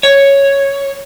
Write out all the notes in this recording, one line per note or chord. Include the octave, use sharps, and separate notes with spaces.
C#5